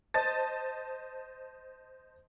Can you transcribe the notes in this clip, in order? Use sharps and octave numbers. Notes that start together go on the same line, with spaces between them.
C5 D#5 A5 A6